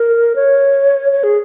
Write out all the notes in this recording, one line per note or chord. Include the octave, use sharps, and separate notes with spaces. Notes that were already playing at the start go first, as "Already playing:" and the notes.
Already playing: A#4
C#5
C#5
G#4